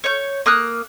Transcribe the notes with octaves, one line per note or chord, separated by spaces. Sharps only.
C#5 G6
A#3 D#6 F6 F#6